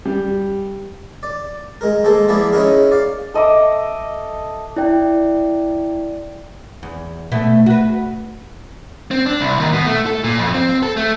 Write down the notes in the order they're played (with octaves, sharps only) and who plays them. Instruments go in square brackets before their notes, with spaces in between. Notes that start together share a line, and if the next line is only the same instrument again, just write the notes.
[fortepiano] G3
[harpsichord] D5
G#3 A#4
G#3 A#3 A4 C5
F3 A#3 B3 E4 G#4 D5
C#4 D#4 E4 G#4 A#4
D5 F5
[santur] A4 D#5 E5 D6
[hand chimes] E4 D5 G5
[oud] E2
B2 A3 E5
F#4 B4
[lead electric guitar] C4
D4
C2
D#2
B2
A3
A4
A#2
F2
C4
A4
A3